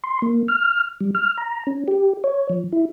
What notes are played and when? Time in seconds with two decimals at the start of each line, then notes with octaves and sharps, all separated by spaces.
0.04 C6
0.22 A#3
0.48 F6
1.01 G3
1.15 F6
1.38 A#5
1.67 C#4
1.88 G4
2.24 C#5
2.50 F3
2.72 E4